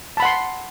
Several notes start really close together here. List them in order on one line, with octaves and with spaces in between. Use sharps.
A5 B5 F#5 C6